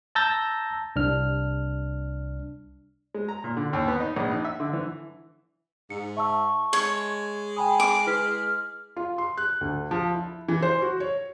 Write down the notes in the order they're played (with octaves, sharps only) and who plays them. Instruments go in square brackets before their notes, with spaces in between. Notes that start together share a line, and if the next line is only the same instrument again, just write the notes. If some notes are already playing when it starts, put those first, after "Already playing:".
[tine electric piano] A5 A#5 E6 G6 A6 A#6
C2 D4 F6
[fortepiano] G#3
A#5
A#2
D3
D#2
B3
D#4
A#1
D#4
E5
D3
E3
[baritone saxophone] G#2 [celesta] C#7
[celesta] E5 A5 E6 [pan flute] C#6
[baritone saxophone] G#3 [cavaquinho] C#5
[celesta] G5 B5 D#6 [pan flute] G#5
[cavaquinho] D6
[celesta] E4 B4 B6 [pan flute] F6
[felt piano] F4
C6
F#6
D2
F3
E4
E3
C5
F#4
C#5